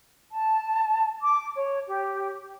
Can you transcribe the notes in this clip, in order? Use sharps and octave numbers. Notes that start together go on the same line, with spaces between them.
A5
D6
C#5
G4